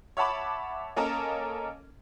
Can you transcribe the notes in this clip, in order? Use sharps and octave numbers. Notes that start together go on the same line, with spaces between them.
C#5 E5 F#5 A5 B5 D6
A#3 C#4 A4 A#4 D#5 A5